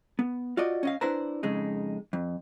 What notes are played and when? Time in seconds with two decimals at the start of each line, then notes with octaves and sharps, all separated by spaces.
0.19 B3
0.57 F4 F#4 D5 D#5
0.83 C#4 D#5 F5
1.01 D4 E4 B4 C5 A#5
1.43 F2 C#3 G#3 D#4
2.13 F2